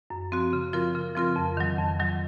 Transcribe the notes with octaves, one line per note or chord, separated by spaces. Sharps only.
F#2
F3 C4 F#4
C#3
F3 C4 F4 A#4
C#3
F3 C4 F4 A#4
F2
D#3 F#3
F2
D#3 F#3